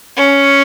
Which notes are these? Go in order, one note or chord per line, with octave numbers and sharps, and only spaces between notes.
C#4